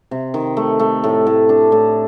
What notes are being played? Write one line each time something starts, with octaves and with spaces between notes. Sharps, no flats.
C3
D#3
A3
A3
A2
A2
D4
A2